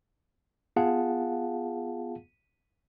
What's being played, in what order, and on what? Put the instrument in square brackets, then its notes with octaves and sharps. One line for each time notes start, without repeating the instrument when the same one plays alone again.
[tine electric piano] B3 F4 G#4 F5 F#5 A5